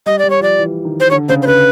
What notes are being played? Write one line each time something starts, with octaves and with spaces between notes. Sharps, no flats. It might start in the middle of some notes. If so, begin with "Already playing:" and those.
G3 D#5
G3 D5
C#5
F3 D5
E3
D#3
C5
D3 C#5
C#3 C5
C5
C#3 B4